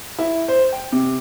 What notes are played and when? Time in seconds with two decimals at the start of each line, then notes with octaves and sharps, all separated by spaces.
0.19 E4
0.48 C5
0.72 G5
0.92 C3